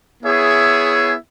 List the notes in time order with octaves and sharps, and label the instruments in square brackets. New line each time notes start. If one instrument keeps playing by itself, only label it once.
[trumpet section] B3 E4 G#4 C#5 E5